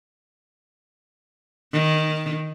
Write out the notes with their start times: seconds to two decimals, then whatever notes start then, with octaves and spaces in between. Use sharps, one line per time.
1.73 D#3